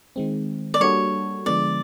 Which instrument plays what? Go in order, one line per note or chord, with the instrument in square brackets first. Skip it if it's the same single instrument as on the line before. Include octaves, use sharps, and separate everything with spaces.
[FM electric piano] D#3 G#3 C4
[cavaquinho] D5
[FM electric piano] G3 A#3 D4 F#4 A4 [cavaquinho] C#5
[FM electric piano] D3 F3 G#3 B3 [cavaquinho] D5